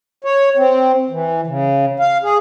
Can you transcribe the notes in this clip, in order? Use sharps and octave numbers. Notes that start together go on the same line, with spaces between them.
C#5
C4
E3
C#3
F5
G#4